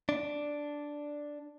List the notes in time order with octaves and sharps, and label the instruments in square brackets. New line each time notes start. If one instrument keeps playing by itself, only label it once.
[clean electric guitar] D4